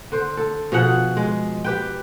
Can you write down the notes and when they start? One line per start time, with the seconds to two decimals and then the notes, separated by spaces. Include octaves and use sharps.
0.12 D3 C5
0.37 A4
0.72 B2 F3 G#4 F#5
1.17 G#3
1.64 G4 B4 G5